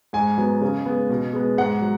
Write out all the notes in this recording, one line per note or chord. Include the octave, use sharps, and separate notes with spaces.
G#2 G#5
F#3 B3
C#3
G#3 B3
B2
G#3 B3
G#2 F#5
F#3